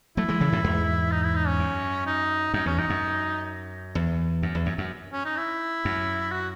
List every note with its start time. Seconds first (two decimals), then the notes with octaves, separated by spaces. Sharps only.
0.17 F#3 A3 E4
0.28 E3 G#3
0.40 C#3 E3
0.52 F#2 A2
0.64 E2 G#2
1.12 D#4
1.23 E4
1.36 D#4
1.47 C#4
1.59 F#2
2.06 D#4
2.54 F#2 D#4
2.66 E2 C#4
2.78 F#2 D#4
2.90 F#2
3.95 E2
4.43 F#2
4.55 E2
4.66 F#2
4.78 F#2
5.12 C#4
5.25 D#4
5.37 E4
5.85 F#2
6.32 F#4